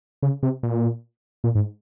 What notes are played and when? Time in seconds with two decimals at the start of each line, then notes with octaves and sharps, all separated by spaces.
0.23 C#3
0.43 C3
0.63 A#2
1.44 A#2
1.55 G#2